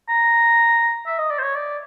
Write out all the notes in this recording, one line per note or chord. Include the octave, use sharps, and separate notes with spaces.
A#5
E5
D#5
D5
C5
C#5
D5